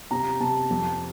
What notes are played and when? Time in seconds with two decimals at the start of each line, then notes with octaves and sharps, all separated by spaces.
0.11 C3 A#5
0.40 C3 A5
0.70 F2